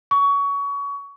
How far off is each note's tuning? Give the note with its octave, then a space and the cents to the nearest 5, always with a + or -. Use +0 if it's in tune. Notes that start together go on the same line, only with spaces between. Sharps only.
C#6 +25